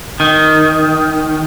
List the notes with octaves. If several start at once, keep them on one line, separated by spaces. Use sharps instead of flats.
D#3